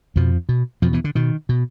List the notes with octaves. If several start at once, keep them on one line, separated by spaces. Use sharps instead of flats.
F2 B2 F3
B2
F2 B2 F3
E2 E3
D3
B2 D#3
B2